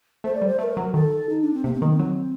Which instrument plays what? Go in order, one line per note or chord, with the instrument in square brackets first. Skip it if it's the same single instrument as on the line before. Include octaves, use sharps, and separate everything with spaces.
[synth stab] A3 [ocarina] C5
[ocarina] D5
[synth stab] G3
[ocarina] C5
[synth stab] A3 [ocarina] C5
[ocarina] A#4
[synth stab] F#3
[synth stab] D#3 [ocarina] A4
[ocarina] D#4
D4
C4
[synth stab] C3 [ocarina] A#3
[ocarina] C4
[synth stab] D#3 [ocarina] A#3
[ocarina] C4
[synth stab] F#3